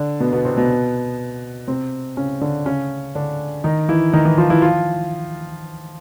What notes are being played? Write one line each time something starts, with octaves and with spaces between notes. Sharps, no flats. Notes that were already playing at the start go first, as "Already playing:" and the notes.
Already playing: D3 D4
B2 B3
B2 B3
C3 C4
B2 B3
C3 C4
C#3 C#4
D3 D4
C#3 C#4
D3 D4
D#3 D#4
E3 E4
D#3 D#4
E3 E4
F3 F4
E3 E4
F3 F4